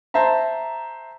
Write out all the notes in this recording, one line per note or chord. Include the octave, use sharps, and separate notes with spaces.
C5 E5 A5 A#5